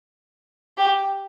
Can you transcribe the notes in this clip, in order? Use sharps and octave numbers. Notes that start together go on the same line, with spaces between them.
G4